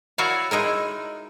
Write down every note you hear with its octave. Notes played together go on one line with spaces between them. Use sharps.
E4 F#4 A#4 C#5 D5 F5
G#3 D#4 E4 A#4